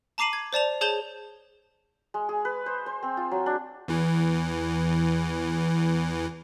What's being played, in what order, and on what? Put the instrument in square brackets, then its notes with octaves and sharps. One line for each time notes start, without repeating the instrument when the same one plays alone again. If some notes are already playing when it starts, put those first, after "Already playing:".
[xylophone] A5 A#5 D6 C7 D#7 F#7
G#6
C5 D5 A5 F7
G#4 C#5 A5 G6 F7 G7
[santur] G#3
G#4
B4
C5
C5
C4
F4
F#3
D4
[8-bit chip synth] E2 E3